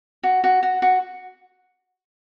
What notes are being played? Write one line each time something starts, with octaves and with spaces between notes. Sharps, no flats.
F#4
F#4
F#4
F#4